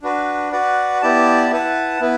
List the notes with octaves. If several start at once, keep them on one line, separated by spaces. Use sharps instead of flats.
D4 F#4 B4
F#4 B4 D5 F#5
B3 E4 G4 D5 A5
E4 B4 F#5 A5
B3 E4 B4